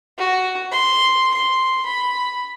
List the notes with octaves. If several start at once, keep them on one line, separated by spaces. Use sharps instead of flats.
F#4
C6
C6
B5